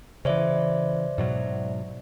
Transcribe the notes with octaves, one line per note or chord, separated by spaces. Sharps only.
C#3 E3 C5 D5 E5
G#2 B2 F#3